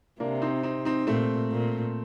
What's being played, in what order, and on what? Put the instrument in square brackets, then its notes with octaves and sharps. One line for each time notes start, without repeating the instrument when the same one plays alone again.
[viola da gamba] C3 [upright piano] A#3 D4
[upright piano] C4 D#4
C4 D#4
C4 D#4
[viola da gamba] A#2 [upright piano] A3 C4
[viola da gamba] A#2